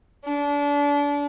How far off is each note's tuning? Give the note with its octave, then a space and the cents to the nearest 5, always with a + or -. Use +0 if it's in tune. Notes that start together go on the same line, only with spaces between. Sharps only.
D4 -30